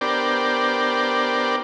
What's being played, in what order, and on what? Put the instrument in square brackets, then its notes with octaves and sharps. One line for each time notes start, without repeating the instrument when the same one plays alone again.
[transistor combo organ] B3 D4 G4 A#4 C5 D5